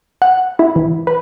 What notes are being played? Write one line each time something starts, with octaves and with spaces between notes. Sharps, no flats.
F#5
E4
E3
B4